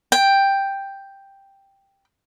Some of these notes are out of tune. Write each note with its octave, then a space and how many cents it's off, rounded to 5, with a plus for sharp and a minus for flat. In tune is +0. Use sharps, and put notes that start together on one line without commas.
G5 +5